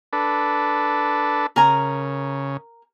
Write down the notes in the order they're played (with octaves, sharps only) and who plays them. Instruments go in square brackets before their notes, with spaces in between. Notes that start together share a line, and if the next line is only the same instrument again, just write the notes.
[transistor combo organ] D4 A4 B4
[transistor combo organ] C#3 [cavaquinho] A#4 G#5 A#5